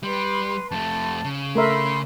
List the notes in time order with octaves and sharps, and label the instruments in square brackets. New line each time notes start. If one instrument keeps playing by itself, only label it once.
[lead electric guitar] G3 [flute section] B4 C6
[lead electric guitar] F2 A3 [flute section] A5
[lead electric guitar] C#3
[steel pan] A3 A#4 E5 [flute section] B5 C6